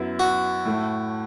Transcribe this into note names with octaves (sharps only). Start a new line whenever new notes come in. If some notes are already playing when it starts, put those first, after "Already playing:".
Already playing: F#2 F#3 B3 E4
F#4
A2 A3 E4